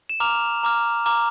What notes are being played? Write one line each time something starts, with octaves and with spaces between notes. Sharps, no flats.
E7
A#5 D6 F6 F7
A#5 D6 F6
A#5 D6 F6